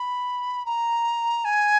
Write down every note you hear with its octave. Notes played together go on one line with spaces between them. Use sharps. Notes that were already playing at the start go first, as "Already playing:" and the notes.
Already playing: B5
A#5
G#5